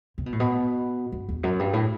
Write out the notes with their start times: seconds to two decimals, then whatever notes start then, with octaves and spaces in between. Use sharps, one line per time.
0.18 C3
0.26 B2
0.32 A2
0.40 B2
1.12 G2
1.29 E2
1.43 F#2
1.59 G2
1.73 A2